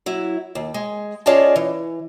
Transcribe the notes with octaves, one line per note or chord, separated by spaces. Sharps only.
F#3 E4
D#2
G#3
C#4 F4 G#4 D5 D#5 A5
E3